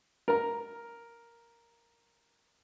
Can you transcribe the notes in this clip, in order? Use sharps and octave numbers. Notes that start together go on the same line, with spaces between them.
A#4 A#5